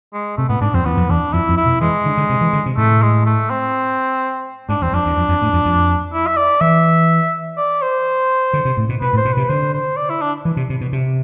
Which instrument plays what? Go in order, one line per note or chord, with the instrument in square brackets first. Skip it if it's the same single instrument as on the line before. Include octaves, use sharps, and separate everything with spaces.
[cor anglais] G#3
[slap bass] C3 [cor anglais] A3
[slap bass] A2 [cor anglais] B3
[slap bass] G#2 [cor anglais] D4
[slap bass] F2 [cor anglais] C4
[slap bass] E2 [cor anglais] B3
[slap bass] F2
[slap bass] E2 [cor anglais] D4
[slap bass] F2 [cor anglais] E4
[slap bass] F2
[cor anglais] E4
[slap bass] B2
[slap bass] E3 [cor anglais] G#3
[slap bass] D3
D3
C3
E3
D3
C3
[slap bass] A2 [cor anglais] A3
[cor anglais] G#3
A3
C4
[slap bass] G#2 [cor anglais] D4
[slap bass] E2 [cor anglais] C4
[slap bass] F2 [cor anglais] D4
[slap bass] E2
F2
F2
A2
F2
F2
[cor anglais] E4
E5
D5
[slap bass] E3 [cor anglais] E5
[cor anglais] D5
C5
[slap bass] D3
C3
A2
B2
[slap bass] B2 [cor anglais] B4
[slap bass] A2
[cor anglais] C5
[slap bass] B2
[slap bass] C3 [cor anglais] B4
[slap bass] D3 [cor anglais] C5
[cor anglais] C5
D5
E4
D4
[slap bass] E3
C3
C3
B2
C3